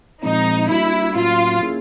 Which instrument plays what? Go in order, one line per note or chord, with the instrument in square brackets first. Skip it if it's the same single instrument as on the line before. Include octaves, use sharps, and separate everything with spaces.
[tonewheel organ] A#2 F3 G#3 C4 [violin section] D#4
[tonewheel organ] G3 A#3 D4 F#4 [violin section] E4
[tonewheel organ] A2 F#3 A#3 C#4 F#4 [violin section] F4
[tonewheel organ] A#3 C#4 E4 G#4